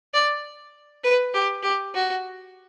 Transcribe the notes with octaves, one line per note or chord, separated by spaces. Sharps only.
D5
B4
G4
G4
F#4